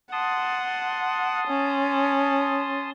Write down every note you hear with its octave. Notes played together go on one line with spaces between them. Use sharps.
F#5 A5 C6 D#6
C#4